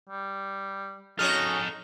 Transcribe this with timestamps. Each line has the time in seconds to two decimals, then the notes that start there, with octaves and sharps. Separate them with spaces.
0.09 G3
1.19 C#4 D#4 F#4 G#4 A4 D#5 F6